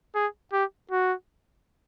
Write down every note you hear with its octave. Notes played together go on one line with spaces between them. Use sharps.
G#4
G4
F#4